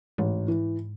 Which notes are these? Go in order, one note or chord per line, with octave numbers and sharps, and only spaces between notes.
A1 G#2
E3